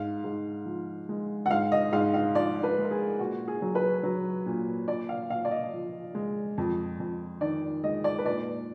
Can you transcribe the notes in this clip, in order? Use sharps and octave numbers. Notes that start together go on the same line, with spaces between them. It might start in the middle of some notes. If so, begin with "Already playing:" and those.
Already playing: G#2 F5
G#2
F3
G#3
F#5
G#2 F5
D#5
G#2 F5
F5
F3 D5
B4
G#3
A#4
G#4
A#2 F#4
G#4
F#3
B4
F#3
A#2
A#2 D5
F5
A#2 F5
D5
D#5
F3
G#3
F2
F2
D#3 D5
G#3 D#5
D5
B4
A#2 D5